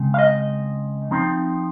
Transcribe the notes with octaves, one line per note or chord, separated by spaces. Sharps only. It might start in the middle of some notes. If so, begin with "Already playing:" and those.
Already playing: C#3 G#3 C4
F5
D#5
F3 C4 D#4